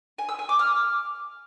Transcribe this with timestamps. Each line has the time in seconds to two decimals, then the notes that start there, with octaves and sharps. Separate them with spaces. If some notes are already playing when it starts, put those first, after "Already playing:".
0.18 G#5
0.29 E6
0.39 G#5
0.49 D6
0.59 F6